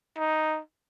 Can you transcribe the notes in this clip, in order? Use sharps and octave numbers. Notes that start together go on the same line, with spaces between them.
D#4